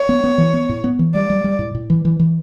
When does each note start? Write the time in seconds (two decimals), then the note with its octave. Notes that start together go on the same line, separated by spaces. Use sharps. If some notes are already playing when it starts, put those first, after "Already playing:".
Already playing: C#5
0.09 B3
0.24 B3
0.38 E3
0.54 B3
0.69 A2
0.84 B3
0.99 E3
1.14 G3 D5
1.30 G3
1.44 G3
1.59 A2
1.75 A2
1.90 E3
2.05 E3
2.19 E3